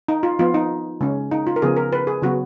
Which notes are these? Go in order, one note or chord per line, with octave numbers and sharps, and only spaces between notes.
D#4
F4
F3 B3 F4
D#4
C#3 G#3 C#4
D#4
F4
A#4
C#3 F3 B3 G#4
A#4
B4
G#4
C#3 F#3 B3 F#4